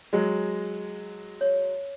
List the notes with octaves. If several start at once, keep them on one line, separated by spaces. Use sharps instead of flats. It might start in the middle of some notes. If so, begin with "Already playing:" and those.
F#3 G#3
C#5